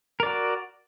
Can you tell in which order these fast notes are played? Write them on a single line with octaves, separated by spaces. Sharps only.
A#4 D5 F#4